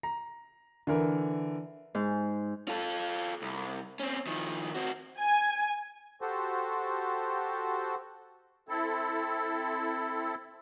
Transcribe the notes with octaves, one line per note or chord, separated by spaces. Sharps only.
A#5
D3 E3 A#4
G#2
F4 A4
C2
C4 C#4
D#3 F3
C4 F#4
G#5
F#4 G4 A4 C5
C4 E4 A4